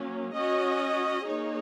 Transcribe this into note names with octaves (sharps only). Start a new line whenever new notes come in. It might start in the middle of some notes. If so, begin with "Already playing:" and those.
Already playing: F#3 A#3 C#4
C#4 F#4 D#5
A#3 D#4 G#4 C#5